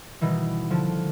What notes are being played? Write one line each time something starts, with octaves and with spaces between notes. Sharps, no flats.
B2 D#3 E3 G3
D3 F3